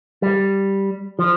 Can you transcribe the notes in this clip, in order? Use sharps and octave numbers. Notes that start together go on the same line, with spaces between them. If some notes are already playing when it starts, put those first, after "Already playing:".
G3
F3